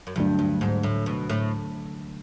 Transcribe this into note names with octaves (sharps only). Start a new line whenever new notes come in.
F#2
D2 G2 D3 F#3 A3 D4
G2
G#2
A2
B2
A2